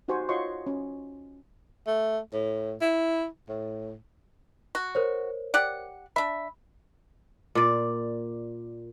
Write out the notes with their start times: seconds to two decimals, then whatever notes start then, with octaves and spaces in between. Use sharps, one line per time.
0.08 D#4 F#4 G4 C5 G#5 C#6
0.29 F4 F#4 C#5 D#5 C6 C#6
0.67 C#4
1.87 A3
2.34 A2
2.81 E4
3.49 A2
4.75 F#4
4.95 A#4 C5 C#5
5.54 G4 D5 F#5
6.16 D4 E5 B5
7.55 A#2 D5